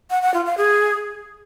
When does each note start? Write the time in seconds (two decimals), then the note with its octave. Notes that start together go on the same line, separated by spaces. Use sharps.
0.11 F#5
0.22 F#5
0.34 F4
0.46 F5
0.58 G#4